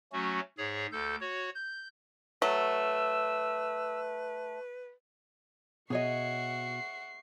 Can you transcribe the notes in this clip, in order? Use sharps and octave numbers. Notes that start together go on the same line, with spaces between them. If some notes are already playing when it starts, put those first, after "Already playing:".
F#3 A3 C#4 F#4
G#2 G#4 C#5
D2 A4 G6
F#4 C#5
G6
F#3 A3 B4 E6
B2 G#4 C#5 D#5 E5 F#5 C#6 C7